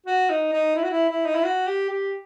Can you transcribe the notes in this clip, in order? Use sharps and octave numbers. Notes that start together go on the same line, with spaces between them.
F#4
D#4
D#4
E4
F#4
E4
E4
D#4
E4
F#4
G4
G4